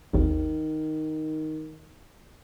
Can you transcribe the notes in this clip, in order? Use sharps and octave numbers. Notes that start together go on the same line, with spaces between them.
G#1 D#2 D#3